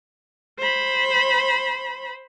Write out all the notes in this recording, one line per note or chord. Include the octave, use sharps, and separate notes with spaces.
C5 B5